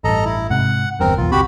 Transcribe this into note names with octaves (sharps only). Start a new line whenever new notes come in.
A1 G2 A4 D#5 A#5
E4
G#2 C3 F#5
G1 E2 G2 C4 A#4
B1 E2 F4
F#1 C#2 C4 F#4 G4 B5